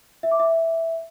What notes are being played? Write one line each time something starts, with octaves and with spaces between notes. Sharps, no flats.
E5
D6
E5